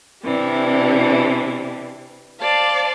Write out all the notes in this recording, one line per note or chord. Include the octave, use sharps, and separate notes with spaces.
C3 E3 G3 D4
C5 D5 F5 A5